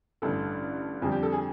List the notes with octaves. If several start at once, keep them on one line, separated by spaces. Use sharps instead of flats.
A1 G2 D3 A4
F2 D3 G3 G#4
G4
A4
G#4